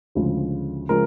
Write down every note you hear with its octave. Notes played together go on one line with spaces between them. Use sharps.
D2 C#3 F3 G#3
C#3 F3 G#3 A#4